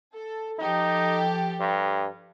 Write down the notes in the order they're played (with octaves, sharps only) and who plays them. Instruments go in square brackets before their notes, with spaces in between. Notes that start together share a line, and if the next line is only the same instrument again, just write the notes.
[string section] A4
[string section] F3 G4 A4 [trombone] D#4
[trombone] G2